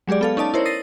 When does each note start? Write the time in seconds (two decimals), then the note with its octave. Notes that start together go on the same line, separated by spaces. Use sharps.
0.07 F#3 G#3 G4 G#4 D5
0.21 B3 A4 F5
0.37 C#4 D#4 D5 A5
0.54 E4 A#4 C5 C#5
0.65 D#6 A6 A#6 C7 D#7